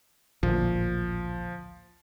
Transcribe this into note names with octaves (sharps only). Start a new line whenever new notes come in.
A1 D2 A#2 F3